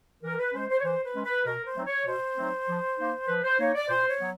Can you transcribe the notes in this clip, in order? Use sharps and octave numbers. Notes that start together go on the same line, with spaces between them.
E3 A#4
B4
G#3 C#4 C5
C5
C#5
E3 C5
B4
G#3 C#4
B4
B2 A#4
C5
F#3 A3 C4 D#4
C#5
B2 C5
F#3 A3 C4 D#4
F3
A#3 D#4
F3 B4
C5
A#3 D#4 C#5
D5
A#2 C5
C#5
F#3 B3